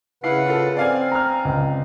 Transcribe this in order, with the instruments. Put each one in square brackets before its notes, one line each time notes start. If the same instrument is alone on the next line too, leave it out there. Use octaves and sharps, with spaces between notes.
[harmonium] C#3 B4 F#5 [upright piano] E4 F5 C7
[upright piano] F4 A4
[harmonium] C4 [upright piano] D5 F5 G#5
[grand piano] A#5 F6
C#2